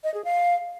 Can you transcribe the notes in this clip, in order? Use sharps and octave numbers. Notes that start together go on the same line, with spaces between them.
D#5
G#4
F5